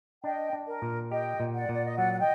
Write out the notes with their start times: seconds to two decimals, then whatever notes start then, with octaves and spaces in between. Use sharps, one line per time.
0.24 D4 D#5 G5
0.53 D4
0.67 A#4
0.82 A#2
1.11 G4 D#5 G5
1.40 A#2
1.54 D5 F#5
1.69 A#2 D5
1.85 D#5
1.98 F#3 D5 F#5
2.13 F#5
2.19 D#5 G5